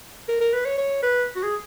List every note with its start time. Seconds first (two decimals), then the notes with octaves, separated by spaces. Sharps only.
0.29 A#4
0.41 A#4
0.53 B4
0.66 C#5
0.78 C#5
1.03 B4
1.36 F#4
1.44 G#4